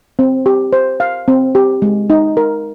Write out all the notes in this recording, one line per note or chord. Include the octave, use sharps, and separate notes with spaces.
C4
G4
C5
F5
C4
G4
G#3
D#4
A#4